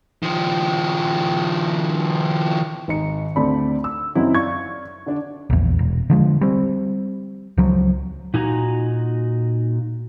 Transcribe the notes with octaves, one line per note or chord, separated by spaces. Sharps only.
D#3 F3
G#1 D#4 C#7
D2 A3 C4 D5 B5
E6
F#2 C#3 C4 D#4 E4 F#4
D5 F5 C#6 G#6
D3 D4 D5
A#1 E2
E1
D3 F3 G#3
G3 C4
C#2 F3 F#3
A#2 D#4 F#4 G#5 A#5